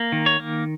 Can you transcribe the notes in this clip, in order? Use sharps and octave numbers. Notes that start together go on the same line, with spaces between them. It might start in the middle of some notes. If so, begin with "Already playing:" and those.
Already playing: A#3
D#3
C#5
A#3